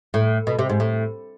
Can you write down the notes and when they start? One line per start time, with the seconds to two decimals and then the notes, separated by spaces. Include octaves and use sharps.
0.14 A2
0.47 B2
0.59 C3
0.70 G#2
0.80 A2